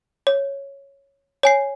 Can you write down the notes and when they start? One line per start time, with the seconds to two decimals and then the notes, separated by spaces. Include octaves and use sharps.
0.27 C#5
1.43 C#5 G#5 C7